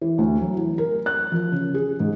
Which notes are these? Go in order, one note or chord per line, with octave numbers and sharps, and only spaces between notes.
E3
D2
F#3
E3
A#4
F#6
F3
C#3
G#4
G#2